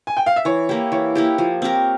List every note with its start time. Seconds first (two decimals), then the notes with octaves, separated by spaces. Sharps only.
0.07 G#5
0.17 G5
0.26 F5
0.36 E5
0.45 E3 C#5
0.69 A#3 E4 G4
0.92 E3 C#5
1.15 A#3 E4 G4
1.38 F3
1.62 C4 G4 A#4